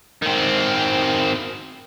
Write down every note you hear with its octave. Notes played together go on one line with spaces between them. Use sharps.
D#3 C4